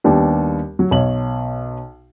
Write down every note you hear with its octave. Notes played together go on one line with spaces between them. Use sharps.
D#2 G3 B3 D4
F#3
B1 C#5 F#7